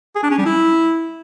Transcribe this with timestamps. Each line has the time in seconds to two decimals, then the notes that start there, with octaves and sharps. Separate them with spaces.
0.15 G#4
0.23 D4
0.30 C#4
0.38 G3
0.46 E4